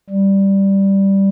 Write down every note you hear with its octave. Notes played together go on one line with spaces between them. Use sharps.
G3